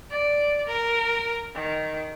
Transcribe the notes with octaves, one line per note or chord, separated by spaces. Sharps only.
D5
A#4
D#3